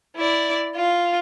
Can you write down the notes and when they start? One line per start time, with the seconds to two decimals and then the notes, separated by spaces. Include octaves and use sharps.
0.16 E4 D5
0.76 F4